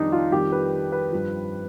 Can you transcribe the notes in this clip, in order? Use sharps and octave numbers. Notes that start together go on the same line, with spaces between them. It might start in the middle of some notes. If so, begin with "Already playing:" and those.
Already playing: F2 D#3 G3 D4 D#4
F4
F2 D#3 G3 G4
B4
B4
G2 F3